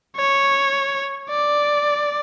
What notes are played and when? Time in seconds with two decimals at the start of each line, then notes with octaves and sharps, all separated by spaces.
0.17 C#5
1.30 D5